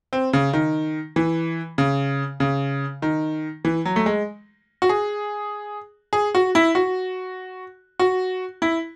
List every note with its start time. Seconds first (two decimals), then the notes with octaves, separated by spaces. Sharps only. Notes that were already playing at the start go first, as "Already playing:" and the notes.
0.13 C4
0.33 C#3
0.53 D#3
1.16 E3
1.78 C#3
2.40 C#3
3.02 D#3
3.65 E3
3.85 F#3
3.96 A3
4.06 G#3
4.82 F#4
4.89 G#4
6.13 G#4
6.35 F#4
6.55 E4
6.75 F#4
8.00 F#4
8.62 E4